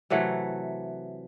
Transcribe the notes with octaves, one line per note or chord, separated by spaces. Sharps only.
C3 E3 F#3 A3